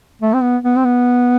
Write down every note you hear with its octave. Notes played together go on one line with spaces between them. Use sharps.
A3
C4
B3
B3
C4
B3